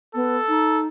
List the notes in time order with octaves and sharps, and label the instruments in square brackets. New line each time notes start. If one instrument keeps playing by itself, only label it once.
[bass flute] B3 [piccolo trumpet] A4
[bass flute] D#4